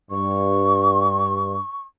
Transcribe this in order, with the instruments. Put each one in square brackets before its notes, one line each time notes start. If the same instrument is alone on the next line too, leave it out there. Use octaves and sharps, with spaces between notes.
[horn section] G2 [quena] C#6